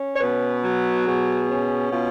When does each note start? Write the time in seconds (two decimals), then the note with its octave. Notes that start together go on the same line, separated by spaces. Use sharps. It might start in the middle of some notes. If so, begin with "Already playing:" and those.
Already playing: C#4
0.15 C#5
0.21 B2 B4
0.63 F#3
1.06 B2 G#4
1.49 C#4
1.91 B2 F4